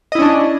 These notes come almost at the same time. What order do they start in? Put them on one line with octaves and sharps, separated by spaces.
D#5 E4 C#4 D4